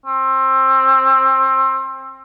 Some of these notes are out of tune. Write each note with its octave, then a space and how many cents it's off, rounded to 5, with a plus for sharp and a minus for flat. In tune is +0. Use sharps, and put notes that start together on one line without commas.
C4 +25